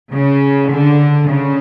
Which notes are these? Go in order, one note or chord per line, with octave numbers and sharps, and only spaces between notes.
C#3
D3
C#3